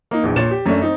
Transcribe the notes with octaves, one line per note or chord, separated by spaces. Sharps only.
A#3 D#4
A#1 E2
A#2 C#5 A6 E7
G4
F#2 A3 C#4 D4
C4 D#4